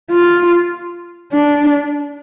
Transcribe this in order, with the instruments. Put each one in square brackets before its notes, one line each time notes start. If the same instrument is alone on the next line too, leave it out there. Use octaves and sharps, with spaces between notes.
[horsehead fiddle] F4
D4